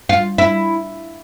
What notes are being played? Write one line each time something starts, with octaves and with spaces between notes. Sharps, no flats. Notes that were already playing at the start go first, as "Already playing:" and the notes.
F4
E4